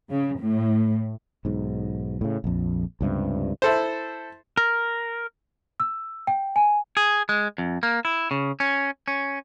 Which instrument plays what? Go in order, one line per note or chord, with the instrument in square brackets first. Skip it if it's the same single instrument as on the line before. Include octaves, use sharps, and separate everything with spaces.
[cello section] C#3
A2
[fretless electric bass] B1 G#2
A2 C#3
A#1 F2
C#2 G2 C3
[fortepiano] E4 A4 C5
[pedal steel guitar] A#4
[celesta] E6
G5
G#5
[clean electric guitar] G#4
G#3
F2
A#3
E4
C#3
C#4
C#4